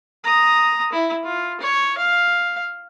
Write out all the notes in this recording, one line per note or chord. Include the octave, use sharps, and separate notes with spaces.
A#5 D#6
E4
F4
C#5
F5